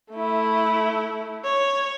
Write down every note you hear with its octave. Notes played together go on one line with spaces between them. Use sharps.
A3 E4
C#5